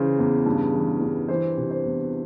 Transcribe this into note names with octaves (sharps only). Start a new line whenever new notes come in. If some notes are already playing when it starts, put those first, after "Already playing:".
Already playing: C#3 E3 C5
E2
G2
E3
G2
E3 C5
C3
C5
E2